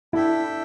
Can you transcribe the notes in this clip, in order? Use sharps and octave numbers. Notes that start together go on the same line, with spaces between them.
D4 E4 A4 E5 G5